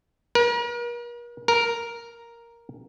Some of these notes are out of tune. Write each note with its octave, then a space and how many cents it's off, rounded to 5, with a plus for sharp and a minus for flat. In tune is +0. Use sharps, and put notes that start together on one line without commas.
A#4 +40
A#4 +0